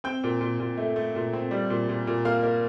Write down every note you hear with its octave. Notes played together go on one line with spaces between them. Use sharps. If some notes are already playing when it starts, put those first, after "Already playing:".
C4 G5 G6
A#2
A#2
A#2
A3
A3
A#2
C4
G3
A#2
A#2
A#2
A#3 F5 F6
A#3